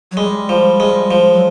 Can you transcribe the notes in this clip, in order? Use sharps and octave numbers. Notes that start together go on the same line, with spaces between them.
F#3
G3 G#3
F3
G#3
F3
F#3